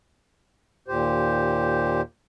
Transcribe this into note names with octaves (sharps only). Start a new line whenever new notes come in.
D#2 A#2 G4 C5